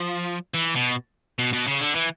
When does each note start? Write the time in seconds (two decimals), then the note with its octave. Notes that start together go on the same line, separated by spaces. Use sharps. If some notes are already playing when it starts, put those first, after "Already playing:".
Already playing: F3
0.54 E3
0.75 B2
1.39 B2
1.53 B2
1.67 C#3
1.81 D3
1.95 E3